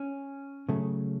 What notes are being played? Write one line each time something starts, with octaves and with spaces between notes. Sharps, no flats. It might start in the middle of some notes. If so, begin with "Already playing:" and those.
Already playing: C#4
C#3 F#3 A3